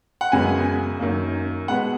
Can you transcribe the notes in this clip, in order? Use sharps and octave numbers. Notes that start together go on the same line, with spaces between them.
F#5
F#2 C#3 G#3 B3 G#5
F#2 D#3 A#3
B2 G#3 B3 F#5